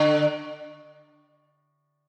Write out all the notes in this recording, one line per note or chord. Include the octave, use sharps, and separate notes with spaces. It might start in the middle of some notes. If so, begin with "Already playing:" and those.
Already playing: D3